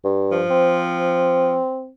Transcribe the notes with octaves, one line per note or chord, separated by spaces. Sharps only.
G2
F3
C4